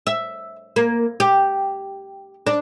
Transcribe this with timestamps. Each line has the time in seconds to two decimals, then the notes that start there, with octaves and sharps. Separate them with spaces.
0.07 E5
0.76 A#3
1.20 G4
2.47 D4